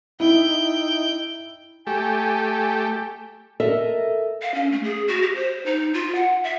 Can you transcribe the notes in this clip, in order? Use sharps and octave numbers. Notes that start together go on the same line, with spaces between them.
D#4 E4 G5
A3 G4 G#5
A4 A#4 D#5 E5
F5
C#4
A3
G#4
F#4
G4
C5
D#4
F4
F#5
E5